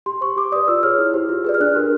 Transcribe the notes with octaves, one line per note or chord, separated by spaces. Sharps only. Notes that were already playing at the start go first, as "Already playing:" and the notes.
G4 C6
C5 C#6
G4 D6
B4 D5 D#6
F4 E6
G#4 C#5 F6
E4
G4 C5
F4
G#4 B4 D5
F6
D4 F#6
G4 A#4